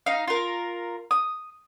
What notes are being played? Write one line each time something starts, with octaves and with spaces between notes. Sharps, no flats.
D#4 F5
F4 A#4
D#6